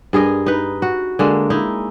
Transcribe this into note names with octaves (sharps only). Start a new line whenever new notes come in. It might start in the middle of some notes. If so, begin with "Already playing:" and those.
G2 G#4 A#4 D#5
D#4 B4
F#4
D3 G#3 A#3
D#4 E4